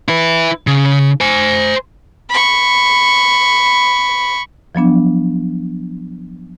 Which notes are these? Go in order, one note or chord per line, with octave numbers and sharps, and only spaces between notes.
E4 B4
C#3
C5 G#5
B5 C#6
F3 F#3 B3 D4